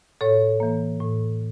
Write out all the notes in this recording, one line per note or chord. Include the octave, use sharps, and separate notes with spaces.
A2 A4 C#5
E3 A#3
A2